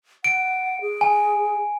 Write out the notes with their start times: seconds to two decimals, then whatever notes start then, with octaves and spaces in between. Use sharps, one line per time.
0.24 F#5 D7
0.82 G#4
1.01 G#5